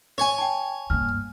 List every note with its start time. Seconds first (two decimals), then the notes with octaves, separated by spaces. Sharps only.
0.18 C#5 G#5
0.38 G5 A5
0.90 G2 A#3 F6